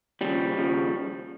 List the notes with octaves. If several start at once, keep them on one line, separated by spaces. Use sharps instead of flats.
D#2 C#3 F3 G3
D#2 C#3 F3